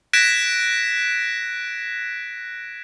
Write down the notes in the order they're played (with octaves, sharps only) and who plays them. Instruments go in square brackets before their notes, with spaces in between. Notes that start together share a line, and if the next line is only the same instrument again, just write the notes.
[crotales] F#6 G#6 A#6 B6 D7 E7